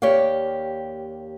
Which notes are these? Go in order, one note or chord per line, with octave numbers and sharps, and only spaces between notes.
D#2 G4 C#5 D5 F5